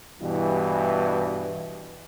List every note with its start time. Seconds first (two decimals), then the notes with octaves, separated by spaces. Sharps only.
0.21 G2 B2 E3